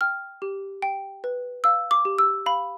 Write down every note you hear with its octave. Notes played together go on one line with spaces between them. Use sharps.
G5 F6
G4
G5
B4
F5 E6
D6
G4
E6
F5 B5